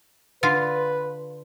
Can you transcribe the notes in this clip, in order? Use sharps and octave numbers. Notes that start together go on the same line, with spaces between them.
D3 F4 B4